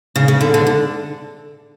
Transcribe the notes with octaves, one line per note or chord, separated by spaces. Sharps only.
C#3
C#3
D3
D3
D3